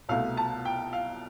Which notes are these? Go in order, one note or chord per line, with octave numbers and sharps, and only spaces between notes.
C2 B2 A3 F5
A5
G5
F5